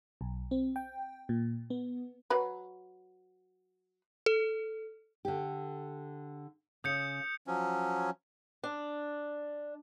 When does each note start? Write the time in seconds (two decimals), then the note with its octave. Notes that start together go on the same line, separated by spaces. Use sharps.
0.21 B1
0.51 C4
0.76 G5
1.29 A#2
1.70 B3
2.30 F#3 B4
4.26 A4
5.25 D3 G4
6.84 C#3 D#6 G6 C#7
7.47 F3 F#3 C#4
8.64 D4